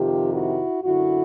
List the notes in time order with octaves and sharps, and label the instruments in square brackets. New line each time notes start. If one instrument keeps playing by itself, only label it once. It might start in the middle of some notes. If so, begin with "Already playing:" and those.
Already playing: [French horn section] F2 C3 D#3 F4 G4
E4 F#4
F#2 D3 E4 F#4